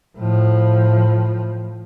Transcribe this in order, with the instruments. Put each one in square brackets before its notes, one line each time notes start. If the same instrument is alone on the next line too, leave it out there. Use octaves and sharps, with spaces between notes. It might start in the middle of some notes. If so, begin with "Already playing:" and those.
[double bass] A2 F3